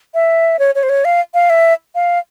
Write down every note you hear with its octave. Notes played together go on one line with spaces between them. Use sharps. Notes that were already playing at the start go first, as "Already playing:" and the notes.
E5
C#5
C#5
C5
C#5
F5
F5
E5
F5